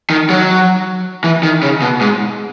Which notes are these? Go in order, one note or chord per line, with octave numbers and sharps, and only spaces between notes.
D#3
F#3
E3
D#3
C#3
B2
G#2